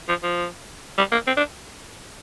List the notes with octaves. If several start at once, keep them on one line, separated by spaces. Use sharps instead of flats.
F3
F3
G3
A#3
C4
D4